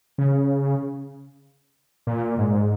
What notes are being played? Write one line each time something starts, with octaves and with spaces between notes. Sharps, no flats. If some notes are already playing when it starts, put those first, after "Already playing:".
C#3
A#2
G#2